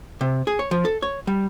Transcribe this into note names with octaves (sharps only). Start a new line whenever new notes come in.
C3
G#4
C#5
F3
A4
C#5
G3